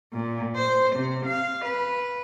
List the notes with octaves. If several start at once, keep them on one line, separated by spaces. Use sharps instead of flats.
A#2
C5
C3
F5
B4